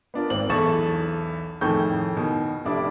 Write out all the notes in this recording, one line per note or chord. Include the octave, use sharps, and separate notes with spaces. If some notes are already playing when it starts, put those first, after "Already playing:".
B3 D4 F4 A#4
G#1 C4 F#7
B1 E2 A4 C#6 A6 E7
F2 A2 D#3 G#4 C#6 G6
B2 D#3
F1 D4 E4 D6